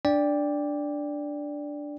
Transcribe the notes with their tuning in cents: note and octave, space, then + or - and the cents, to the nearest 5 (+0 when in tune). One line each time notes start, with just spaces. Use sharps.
D4 +0 D5 -5 G5 +20